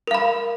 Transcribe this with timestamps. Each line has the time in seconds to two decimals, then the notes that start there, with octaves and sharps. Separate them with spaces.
0.07 A#4
0.11 F5
0.14 B5